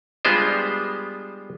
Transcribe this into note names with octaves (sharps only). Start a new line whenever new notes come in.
G3 G#3 B3 D4 F4 C5